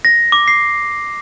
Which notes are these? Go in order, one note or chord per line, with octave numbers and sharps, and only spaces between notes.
A#6
D6
C7